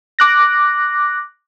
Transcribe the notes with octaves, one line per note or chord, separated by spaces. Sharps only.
D6 F#6 A#6